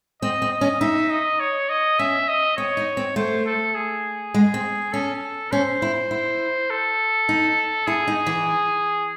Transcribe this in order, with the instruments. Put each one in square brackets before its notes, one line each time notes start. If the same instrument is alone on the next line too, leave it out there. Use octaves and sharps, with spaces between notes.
[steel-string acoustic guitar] C4 [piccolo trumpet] D#5
[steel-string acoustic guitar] C4
[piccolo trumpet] D#5
[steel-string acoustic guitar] C#4
[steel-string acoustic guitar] D#4 [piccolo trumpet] E5
[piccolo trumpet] D#5
C#5
D#5
[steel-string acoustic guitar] C#4 [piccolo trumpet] E5
[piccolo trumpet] D#5
[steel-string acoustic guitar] C4 [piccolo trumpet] C#5
[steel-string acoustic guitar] D#4
C4
[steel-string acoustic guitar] A3 [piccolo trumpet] C5
[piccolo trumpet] A4
G#4
[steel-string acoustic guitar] G#3
C4
[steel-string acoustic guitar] C#4 [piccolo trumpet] A4
[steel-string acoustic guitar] C#4 [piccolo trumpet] C5
[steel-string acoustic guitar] E4
E4
[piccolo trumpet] A4
[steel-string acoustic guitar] D#4
[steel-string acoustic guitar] E4 [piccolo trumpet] G#4
[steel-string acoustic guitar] D#4
E3